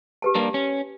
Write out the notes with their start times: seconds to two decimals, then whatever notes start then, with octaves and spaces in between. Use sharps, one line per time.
0.22 G4 B4 A5
0.35 G3 A#3 D4
0.54 C#4